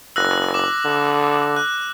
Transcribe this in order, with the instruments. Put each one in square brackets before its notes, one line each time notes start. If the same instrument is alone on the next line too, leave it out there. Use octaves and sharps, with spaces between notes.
[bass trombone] F#1 [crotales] E6 F#6 A#6
[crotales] D6
[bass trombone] D3
[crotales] F#6